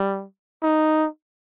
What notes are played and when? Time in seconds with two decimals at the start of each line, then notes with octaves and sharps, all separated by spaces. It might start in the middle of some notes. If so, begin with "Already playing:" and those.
Already playing: G3
0.63 D#4